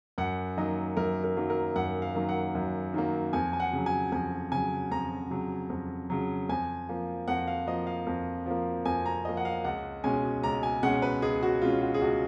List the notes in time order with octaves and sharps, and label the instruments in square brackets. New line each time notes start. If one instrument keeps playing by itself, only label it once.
[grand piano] F#2 F#5
D#3 F#3 A#3 D#5
F#2 A#4
A#4
D#3 F#3 A#3
A#4
F#2 F#5
F5
D#3 F#3 A#3
F#5
F#2
D#3 F#3 A#3
F2 G#5
G#5
F#5
C#3 F#3
G#5
F2 G#5
C#3 F#3 G#5
F2 A#5
C#3 F#3
F2
C#3 F#3
F2 G#5
F3 A#3
F2 F#5
F5
F3 A#3 D#5
F5
F2
F3 A#3
F2 G#5
A#5
F3 A#3 D#5
F#5
F5
C#2 F#5
B2 G#3 C#4 G#5
C#2 A#5
G#5
B2 G#3 C#4 F#5
B4
C#2 G#4
F#4
B2 G#3 C#4 F4
F#4
G#4
C#2 F#4